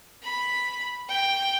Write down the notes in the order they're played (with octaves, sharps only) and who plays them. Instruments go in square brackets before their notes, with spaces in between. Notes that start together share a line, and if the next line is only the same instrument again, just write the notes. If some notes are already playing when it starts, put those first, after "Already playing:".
[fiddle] B5
G5